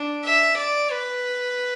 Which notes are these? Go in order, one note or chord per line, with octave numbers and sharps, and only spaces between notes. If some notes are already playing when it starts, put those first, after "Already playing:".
Already playing: D4
E5
D5
B4